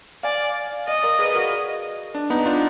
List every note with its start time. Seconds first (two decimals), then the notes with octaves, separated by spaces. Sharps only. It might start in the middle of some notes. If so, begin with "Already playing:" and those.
0.23 D5 F5 G#5
0.88 D5 D#5 F5
1.03 A#4 D5
1.19 G#4 B4
1.35 F#4 A#4
2.15 D4
2.30 B3 D#4
2.46 D4 F4